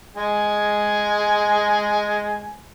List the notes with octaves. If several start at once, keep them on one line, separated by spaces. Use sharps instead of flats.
G#3 G#5